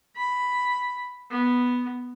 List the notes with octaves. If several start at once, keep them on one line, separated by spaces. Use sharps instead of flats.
B5
B3